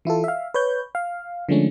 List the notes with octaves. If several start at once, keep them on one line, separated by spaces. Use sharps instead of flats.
E3 E4 F4 A4
E5 F5
B4 C#5 G6
F5
D3 F3 G#3 A3 C#4 D4